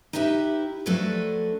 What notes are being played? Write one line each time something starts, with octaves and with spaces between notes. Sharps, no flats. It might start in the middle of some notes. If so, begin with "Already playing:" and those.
D#4 E4 G4 B4 E5
F3 F#3 A3 D4 A4 B4